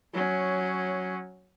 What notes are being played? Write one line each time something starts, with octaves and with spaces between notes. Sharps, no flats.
F#3 C#4